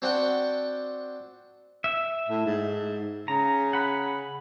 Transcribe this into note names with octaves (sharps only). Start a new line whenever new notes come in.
C4 D4 F#4 F#5 G5
E5
A2
G#2
C#3 A#5
F#5 B5